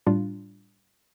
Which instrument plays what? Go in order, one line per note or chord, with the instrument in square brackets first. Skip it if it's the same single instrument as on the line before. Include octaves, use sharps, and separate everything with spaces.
[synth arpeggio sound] A2 G3 D4 F4